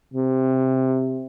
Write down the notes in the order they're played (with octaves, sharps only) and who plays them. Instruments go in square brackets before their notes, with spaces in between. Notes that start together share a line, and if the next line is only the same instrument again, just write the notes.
[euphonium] C3